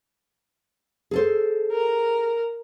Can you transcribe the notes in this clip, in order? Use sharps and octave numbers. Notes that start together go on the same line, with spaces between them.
G#4 A4 C5
A#4